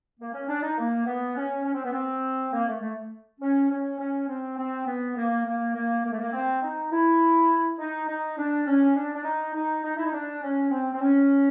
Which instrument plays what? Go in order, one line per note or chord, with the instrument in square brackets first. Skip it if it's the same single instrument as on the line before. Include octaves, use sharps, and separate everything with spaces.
[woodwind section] A#3
C#4
D4
D#4
A#3
B3
C#4
C#4
C4
B3
C4
A#3
A3
A3
C#4
C#4
C#4
C4
C4
B3
A#3
A#3
A#3
A#3
A3
A#3
C4
D#4
E4
D#4
D#4
D4
C#4
D4
D4
D#4
D#4
D#4
E4
D#4
D4
C#4
C4
C4
C#4